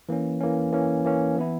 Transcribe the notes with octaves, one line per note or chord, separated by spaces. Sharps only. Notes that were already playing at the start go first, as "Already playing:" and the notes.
E3 A#3 C#4
E3 A#3 C#4
E3 A#3 C#4
E3 A#3 C#4
E3 B3 E4